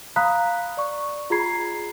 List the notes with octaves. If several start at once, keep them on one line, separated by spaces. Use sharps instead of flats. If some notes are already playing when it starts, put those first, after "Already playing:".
F5 A#5 B5 D#6 F#6 B6
D5 C#6
F4 G#4 A#5 B5 G#6 C7